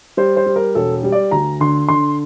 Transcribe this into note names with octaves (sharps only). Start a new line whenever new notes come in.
G3 C5
C5
G3
A#4
E1 A4
G3
D5
D2 A#5
D3 C6
D3 C6